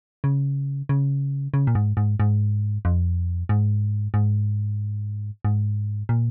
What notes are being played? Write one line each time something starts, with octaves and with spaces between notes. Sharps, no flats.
C#3
C#3
C#3
A#2
G#2
G#2
G#2
F2
G#2
G#2
G#2
A#2